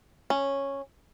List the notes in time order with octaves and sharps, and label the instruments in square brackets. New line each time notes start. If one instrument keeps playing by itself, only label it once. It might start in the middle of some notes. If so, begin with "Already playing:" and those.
[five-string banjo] C#4